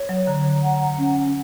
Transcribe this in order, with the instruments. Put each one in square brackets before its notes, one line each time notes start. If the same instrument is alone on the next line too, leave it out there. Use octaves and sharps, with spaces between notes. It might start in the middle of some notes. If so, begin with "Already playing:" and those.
Already playing: [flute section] C#5
[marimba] F#3
[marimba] D3 [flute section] A#5
[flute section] F#5
C#4